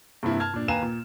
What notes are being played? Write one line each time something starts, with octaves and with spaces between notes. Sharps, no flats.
G2 C3 A#3 E4
A5 F6 G#6
A#2 D4
D#2 B4 F5 G#5 A#5 E7
A#2